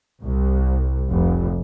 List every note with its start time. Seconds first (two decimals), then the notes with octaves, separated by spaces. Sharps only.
0.22 C2
1.10 F1